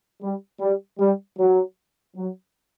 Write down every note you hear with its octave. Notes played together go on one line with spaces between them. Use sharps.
G3
G3
G3
F#3
F#3